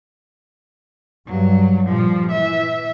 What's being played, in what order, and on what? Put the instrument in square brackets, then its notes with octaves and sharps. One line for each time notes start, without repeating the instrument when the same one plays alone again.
[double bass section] G2 [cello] F#3
[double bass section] A#2 G3 [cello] F3
[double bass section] E3 [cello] E5